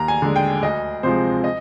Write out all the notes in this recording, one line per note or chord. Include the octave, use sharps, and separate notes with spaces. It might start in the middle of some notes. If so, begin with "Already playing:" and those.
Already playing: D#2 A#5
G#5
D3 G#3
G5
D2 D#5
C3 F3 G#3 C5
D#5